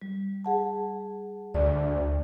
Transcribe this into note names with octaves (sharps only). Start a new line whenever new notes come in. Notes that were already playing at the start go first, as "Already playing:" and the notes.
G3
G#4 F#5 A5
D2 D5